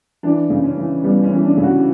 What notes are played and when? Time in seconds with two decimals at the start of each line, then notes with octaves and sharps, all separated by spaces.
0.23 E3 D4
0.50 C#3
0.64 C#4
0.77 E3
1.03 G3 B3
1.24 C#4
1.31 E3
1.44 D4
1.57 C#3
1.63 F#4